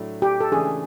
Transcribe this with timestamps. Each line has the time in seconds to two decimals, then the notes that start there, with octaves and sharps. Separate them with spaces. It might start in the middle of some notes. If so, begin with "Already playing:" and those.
Already playing: A2 F#3 A3 D4
0.22 G4
0.41 A4
0.52 C#3 E3 A3 D4 G#4